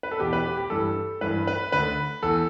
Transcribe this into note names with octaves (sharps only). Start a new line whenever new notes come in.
B4
A4
E2 B2 G4
B4
G4
G4
G2 E3 A4
G2 E3 B4
B4
D2 D3 B4
E2 E3 A4